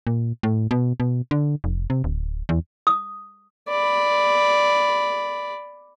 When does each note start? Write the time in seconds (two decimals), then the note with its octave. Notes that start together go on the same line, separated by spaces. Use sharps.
0.07 A#2
0.43 A2
0.71 B2
1.00 B2
1.31 D3
1.64 F1
1.90 C3
2.04 D1
2.49 E2
2.87 D#6
3.69 D5 B5